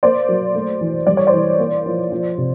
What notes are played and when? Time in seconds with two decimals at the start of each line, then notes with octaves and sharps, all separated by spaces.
0.03 A#3 C5 D5
0.29 F#3
0.55 A3
0.81 E3
1.07 G3 D5
1.17 C#5
1.27 C5 D5
1.34 E3
1.59 A#3
1.86 F3
2.12 F3
2.38 C3